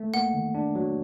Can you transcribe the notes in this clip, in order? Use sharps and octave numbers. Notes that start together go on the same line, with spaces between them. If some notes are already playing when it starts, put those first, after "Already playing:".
Already playing: A3
A#3 F#5
D#3
D4
F#3